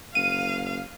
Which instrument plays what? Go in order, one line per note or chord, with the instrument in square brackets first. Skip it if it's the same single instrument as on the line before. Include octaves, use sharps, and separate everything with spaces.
[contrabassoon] F#1 [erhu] F5 [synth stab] D#7